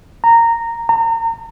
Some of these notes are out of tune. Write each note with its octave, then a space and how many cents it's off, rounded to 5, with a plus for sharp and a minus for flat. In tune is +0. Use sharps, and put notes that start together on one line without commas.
A#5 -15
A#5 -35